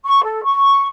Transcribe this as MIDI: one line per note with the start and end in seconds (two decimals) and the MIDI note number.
0.04 0.21 85
0.23 0.42 69
0.44 0.86 85